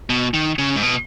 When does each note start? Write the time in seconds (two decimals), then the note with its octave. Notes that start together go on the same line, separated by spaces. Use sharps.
0.10 B2
0.34 D#3
0.59 C#3
0.76 G#2
0.83 B2